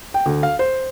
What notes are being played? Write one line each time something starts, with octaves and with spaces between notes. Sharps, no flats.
G5
D2
F5
C5